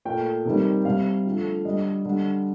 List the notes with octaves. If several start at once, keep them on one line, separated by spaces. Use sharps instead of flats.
A#2 A3 G5
C3 D#3 G3
C3 G3 F5
D3 F3 A3
D3 G3 D#5
D3 G3